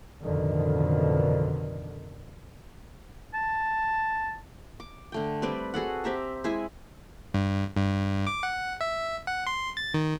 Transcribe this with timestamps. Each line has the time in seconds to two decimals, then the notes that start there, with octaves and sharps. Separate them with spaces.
0.23 A1 F2 B2 D3 D#3
3.34 A5
4.80 D6
5.12 D3 A3 G5
5.42 G3 C4 B4 D5
5.74 F#4 G#4 A4 F#5
6.04 C4 G4 E5 A#5
6.44 G#3 E4 E5 G#5
7.34 G2
7.77 G2
8.27 D6
8.43 F#5
8.81 E5
9.27 F#5
9.47 C6
9.77 A6
9.94 D#3